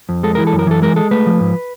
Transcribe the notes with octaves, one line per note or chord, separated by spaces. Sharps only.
F2
G#3 A4
E3 A#4
A4
F#2
A#4
E3 A4
G#3 A#4
G#3 A4
A3 B4
F3
G#2